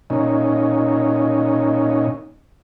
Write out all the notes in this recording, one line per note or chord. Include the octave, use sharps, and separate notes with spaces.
A#2 C#4 D#4